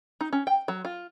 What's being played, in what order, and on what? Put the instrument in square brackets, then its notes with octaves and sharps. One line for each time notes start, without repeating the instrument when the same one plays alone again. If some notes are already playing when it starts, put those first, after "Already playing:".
[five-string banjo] D#4
C#4
G5
F#3
F4